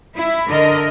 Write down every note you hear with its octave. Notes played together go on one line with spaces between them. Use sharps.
E4
D3 A#4 D#5